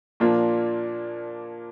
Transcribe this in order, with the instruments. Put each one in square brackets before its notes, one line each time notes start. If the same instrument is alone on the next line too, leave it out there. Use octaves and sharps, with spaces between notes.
[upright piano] A#2 F3 A#3 D4 F4